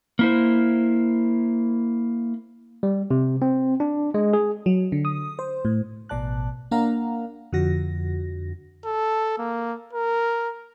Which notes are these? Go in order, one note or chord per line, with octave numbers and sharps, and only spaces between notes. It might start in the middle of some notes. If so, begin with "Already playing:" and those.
A#3 E4 C5
G3
C3
C4
D4
G#3
G#4
F#3
D3
D#6
C5
A2
A1 B2 D5 A5 F#6
A#3 D4 A#4 F5 F#5 A#5
F2 D3 F#4 A#6
A4
A#3
A#4